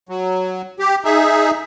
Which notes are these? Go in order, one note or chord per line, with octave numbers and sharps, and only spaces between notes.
F#3
G4
D#4 G#4 E5